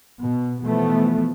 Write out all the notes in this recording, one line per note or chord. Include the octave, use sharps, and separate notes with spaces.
B2
B2 E3 F3 A3 B3